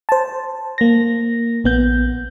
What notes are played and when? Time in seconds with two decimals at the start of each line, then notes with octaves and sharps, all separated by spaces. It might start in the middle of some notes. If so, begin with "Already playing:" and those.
0.09 C5 A5
0.78 A#3 A#6
1.64 A#1 B3 G6